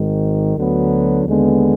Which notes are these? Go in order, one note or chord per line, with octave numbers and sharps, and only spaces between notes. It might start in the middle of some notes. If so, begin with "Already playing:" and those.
Already playing: G#1 G#2 D#3
D2 D3 F#3 B3
D#2 D3 G#3 B3